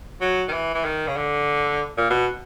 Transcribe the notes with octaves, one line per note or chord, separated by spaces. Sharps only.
F#3
D#3
E3
E3
D#3
C#3
D3
A#2
B2